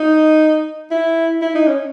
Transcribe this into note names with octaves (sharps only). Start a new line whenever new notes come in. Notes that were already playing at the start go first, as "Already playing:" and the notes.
Already playing: D#4
E4
E4
D#4
C#4